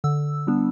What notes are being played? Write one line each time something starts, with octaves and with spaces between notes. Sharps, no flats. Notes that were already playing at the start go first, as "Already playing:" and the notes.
D3 E6
G3 B3 D4